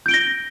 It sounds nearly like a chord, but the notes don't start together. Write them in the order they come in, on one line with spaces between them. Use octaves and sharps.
G6 D7 G7 A#6